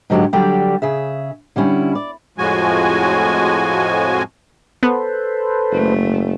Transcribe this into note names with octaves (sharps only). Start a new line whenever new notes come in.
G#2 D3 F#3 G#3 G4
D3 F#3 G3 G4 D5
C#3 G#4 E5
D3 G3 C#4 E4
D5
F2 A2 F3 G#3 F#4 G#5
B3 A4 B4 C5
F#1 A3